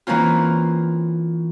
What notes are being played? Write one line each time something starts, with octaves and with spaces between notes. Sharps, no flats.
E3 A#3 C4 C#4 F4